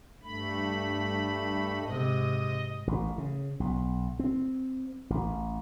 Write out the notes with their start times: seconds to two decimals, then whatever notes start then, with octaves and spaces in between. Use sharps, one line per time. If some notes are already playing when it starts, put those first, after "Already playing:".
0.23 G2 A3 B5
1.82 G#2 C3 D#5
2.87 A1
3.18 C#3
3.60 B1
4.19 C4
5.10 A1